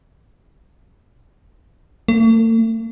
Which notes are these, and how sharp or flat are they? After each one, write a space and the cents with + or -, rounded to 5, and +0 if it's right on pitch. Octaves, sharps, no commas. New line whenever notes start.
A3 +45